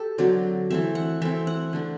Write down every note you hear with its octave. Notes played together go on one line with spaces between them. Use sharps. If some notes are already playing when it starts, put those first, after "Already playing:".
Already playing: G4 A4
D3 F#3 C4 D5
E3 A3 C4 E5
F#5
E3 A3 C4 E5
F#5
D3 A3 D4